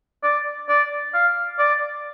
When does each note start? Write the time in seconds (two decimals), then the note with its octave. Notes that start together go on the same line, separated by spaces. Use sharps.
0.23 D5
0.69 D5
1.14 F5
1.59 D5